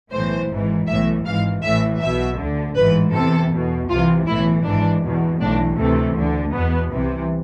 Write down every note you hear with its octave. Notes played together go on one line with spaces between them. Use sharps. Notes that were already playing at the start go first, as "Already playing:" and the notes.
B1 A2 E3 C5
G#1 G#2 E3
B1 A2 E3 E5
G#1 G#2 E3 F5
A1 A2 E3 E5
B1 B2 E5
D2 D3
A1 G#2 E3 B4
E2 C3 E3 A4
E2 B2
C2 C3 E3 F4
B1 A2 E3 E4
G#1 G#2 E3 D4
E2 B2
B1 A2 E3 D4
D2 C3 E3 A3
D2 D3
E2 B2 B3
C2 C3 E3